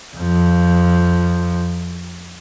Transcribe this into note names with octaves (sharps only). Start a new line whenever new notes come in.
F2 F3